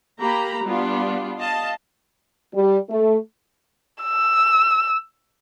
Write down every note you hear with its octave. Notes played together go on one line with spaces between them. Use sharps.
A#3 G4 A#5 B5
G3 B3 D4 F4
D#5 F5 A5
G3
A3
E6